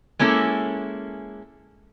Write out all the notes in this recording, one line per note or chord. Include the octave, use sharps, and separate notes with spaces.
G#3 A#3 C#4 E4 A4